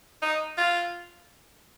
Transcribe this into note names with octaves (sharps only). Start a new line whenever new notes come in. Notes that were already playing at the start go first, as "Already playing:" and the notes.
D#4
F4